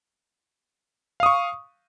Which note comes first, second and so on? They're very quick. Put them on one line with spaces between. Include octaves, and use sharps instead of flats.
F5 D#6 C#6